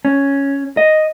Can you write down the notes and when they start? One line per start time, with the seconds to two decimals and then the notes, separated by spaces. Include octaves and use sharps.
0.05 C#4
0.77 D#5